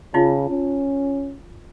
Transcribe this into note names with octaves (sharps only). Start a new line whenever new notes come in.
C#3 D#4 F4
C#4